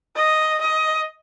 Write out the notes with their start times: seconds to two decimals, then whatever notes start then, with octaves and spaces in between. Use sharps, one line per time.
0.16 D#5
0.61 D#5